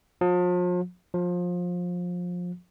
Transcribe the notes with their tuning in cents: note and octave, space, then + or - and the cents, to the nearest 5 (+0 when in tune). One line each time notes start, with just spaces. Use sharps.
F3 +40
F3 +25